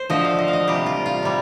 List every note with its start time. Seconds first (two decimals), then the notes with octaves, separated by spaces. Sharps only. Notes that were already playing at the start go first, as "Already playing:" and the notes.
Already playing: C5
0.10 D3 F3 A3 D#5
0.25 F5
0.39 D#5
0.48 F5
0.53 D#5
0.68 C3 G3 G4
0.86 F4
1.06 F4
1.23 C3 G3